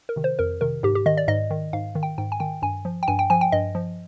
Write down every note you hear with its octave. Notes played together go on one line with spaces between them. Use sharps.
A#4
C3 D#3
C5
F2 A#4
C3 D#3 A#4
G#2 G4
G4
D#3 D#5
D5
G#2 D#5
D#3
G#2 F5
D#3
G5
G#2 G5
G#5
D#3 G5
G2 G#5
F3
G5
G2 G#5
G5
F3 G#5
G5
G2 D#5
F3